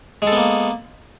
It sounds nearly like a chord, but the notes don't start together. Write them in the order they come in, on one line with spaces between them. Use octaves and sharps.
G#3 A4 B3 A#3